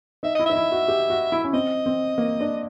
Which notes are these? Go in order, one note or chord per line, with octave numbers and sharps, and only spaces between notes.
D#4 E5
E4 D#5
D#4 E5
E4
F#4
G4
F#4
E4
C#4
C4 D#5
C4
A#3
D4